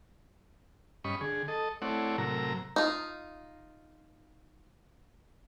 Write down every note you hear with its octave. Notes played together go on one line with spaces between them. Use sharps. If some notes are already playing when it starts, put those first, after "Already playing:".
G2 C#4 D#5 B5 C#6
D3 G#4
A4 D#5
A3 C4 E4 C#5 D5 F#5
A2 C3 F#3 A#4 A#5 E6
D#4 F4